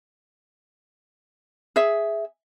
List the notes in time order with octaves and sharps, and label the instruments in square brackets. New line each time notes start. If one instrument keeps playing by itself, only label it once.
[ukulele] G#4 E5